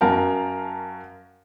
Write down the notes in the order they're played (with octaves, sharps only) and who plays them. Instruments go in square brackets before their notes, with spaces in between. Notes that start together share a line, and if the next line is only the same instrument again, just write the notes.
[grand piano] F#2 F#4 A#4 F5 G5 A5